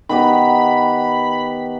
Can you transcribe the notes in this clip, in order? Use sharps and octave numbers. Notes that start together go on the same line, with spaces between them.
D#3 B3 G4 B5